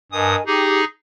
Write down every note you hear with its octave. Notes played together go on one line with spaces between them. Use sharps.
G2 A#4 D#5 G#5 D#6
D#4 G4 G#4 D6